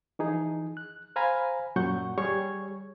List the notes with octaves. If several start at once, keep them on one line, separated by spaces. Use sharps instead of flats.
E3 F3 D#4 G#4
F#6
C5 F5 G#5 A#5 B5
F#2 A#2 F#3 F#5 C#6 G6
G3 G#4 C#5 C#6 G#6